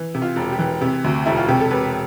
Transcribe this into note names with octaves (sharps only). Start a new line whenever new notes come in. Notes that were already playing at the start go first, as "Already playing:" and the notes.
Already playing: E3
C3
F4
E1
G4
E3
C3
D2
E1 E4
F4
C3 G4
A4
E1 B4